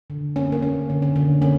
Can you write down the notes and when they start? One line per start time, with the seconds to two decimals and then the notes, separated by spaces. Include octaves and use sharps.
0.10 D3
0.36 A#3 C#4
0.52 A#3
0.63 A#3 C#4
0.90 D3
1.02 C#4
1.16 D3
1.42 A#3 C#4